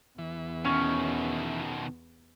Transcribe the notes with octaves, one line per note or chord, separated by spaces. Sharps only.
E2 E3
B2 D#3 C#4